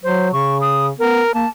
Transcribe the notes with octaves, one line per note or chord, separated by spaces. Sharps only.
F#3 C5
C#3 C#6
D#6
B3 A#4
A#3 A5